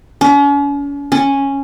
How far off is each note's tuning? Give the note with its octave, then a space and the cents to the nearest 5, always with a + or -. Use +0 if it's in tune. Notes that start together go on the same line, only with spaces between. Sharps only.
C#4 +40
C#4 -5